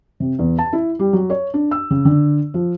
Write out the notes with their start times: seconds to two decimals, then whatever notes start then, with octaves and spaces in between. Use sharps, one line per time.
0.20 C3
0.39 E2
0.59 A5
0.73 E4
0.99 G3
1.13 F#3
1.30 C#5
1.54 D4
1.71 E6
1.90 C#3
2.05 D3
2.54 F3